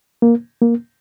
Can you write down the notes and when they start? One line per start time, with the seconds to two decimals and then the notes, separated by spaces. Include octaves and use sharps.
0.22 A#3
0.62 A#3